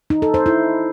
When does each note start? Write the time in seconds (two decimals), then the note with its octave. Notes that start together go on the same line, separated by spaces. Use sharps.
0.10 D#4
0.22 A4
0.34 C5
0.46 E4